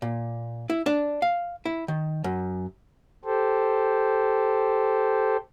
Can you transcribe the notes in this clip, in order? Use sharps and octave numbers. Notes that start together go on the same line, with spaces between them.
A#2
E4
D4
F5
E4
D#3
F#2
G4 A4 C5